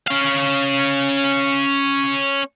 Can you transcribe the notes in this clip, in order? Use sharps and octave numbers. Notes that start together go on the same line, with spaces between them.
C#4 F5